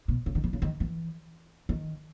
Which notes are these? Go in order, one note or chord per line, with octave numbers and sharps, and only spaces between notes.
B2
C#3
D#3
E3
C#3
D#3
E3
D#3